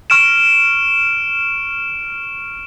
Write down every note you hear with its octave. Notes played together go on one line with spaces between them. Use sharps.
C#6 F6 D7 E7